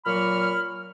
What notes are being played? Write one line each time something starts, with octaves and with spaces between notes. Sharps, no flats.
A#2 F#3 B5 C#6 F6